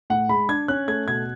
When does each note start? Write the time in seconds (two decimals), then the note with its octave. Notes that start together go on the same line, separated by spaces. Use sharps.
0.10 A2 F#5
0.29 G#3 B5
0.49 D4 G#6
0.68 C#4 F#6
0.88 A3 G#6
1.08 B2 G#6